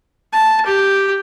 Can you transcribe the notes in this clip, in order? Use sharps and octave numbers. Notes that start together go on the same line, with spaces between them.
A5
G4